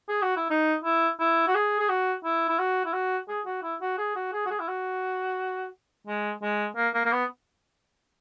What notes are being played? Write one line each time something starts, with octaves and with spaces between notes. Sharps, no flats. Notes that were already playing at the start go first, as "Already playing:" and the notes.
G#4
F#4
E4
D#4
E4
E4
F#4
G#4
G#4
F#4
E4
E4
F#4
E4
F#4
G#4
F#4
E4
F#4
G#4
F#4
G#4
F#4
G#4
E4
F#4
G#3
G#3
A#3
A#3
A#3
B3